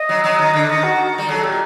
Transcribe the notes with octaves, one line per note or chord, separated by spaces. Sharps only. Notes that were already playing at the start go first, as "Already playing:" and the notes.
Already playing: D#5
F#3
F#3
D#3
D3
D#3 D#5
F#4
G3
F#3 A4
A#2 G4